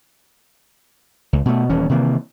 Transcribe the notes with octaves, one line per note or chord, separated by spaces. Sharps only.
C#2
B2 A3
D#1 E3 C#4
C3 D#3 E3 A#3